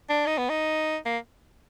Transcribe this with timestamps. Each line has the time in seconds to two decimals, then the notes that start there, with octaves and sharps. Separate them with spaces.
0.09 D4
0.26 D#4
0.38 B3
0.49 D#4
1.06 A#3